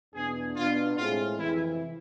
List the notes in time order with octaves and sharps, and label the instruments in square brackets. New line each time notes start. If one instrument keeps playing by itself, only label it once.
[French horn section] E2 B2 B3 D4 [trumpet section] G#4
[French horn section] B2 B3 D4 [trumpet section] F4
[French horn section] A2 G#3 C4 G#4 [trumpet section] F4
[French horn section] F2 C3 E3 [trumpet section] E4